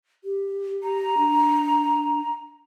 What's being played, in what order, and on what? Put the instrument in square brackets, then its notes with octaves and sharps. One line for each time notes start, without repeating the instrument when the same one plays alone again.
[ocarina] G4
[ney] A#5
[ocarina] D4